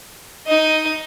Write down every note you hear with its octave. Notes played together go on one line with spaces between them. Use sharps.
D#4 D#5